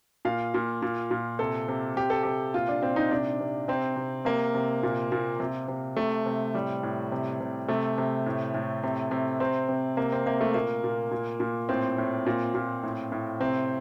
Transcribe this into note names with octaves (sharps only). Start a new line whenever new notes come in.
A#2 F5
A#2
A#2
A#2
C3 A4
C3
C3 G4
A4
C3 G4
A#2 F4
D4
A#2 C4
D#4
C3 D4
C3
C3 C4
C3
C3 A#3
C3
A#2
A#2
C3
C3
C3 A3
C3
A2 G3
A2
C3
C3
C3 A3
C3
A2
A2
C3
C3
C3 C4
C3
C3 A#3
C4
C3 A#3
A3
A#2 A#3
A#2
A#2
A#2
A2 C4
A2
A#2
A#2
A2
A2
C3 C4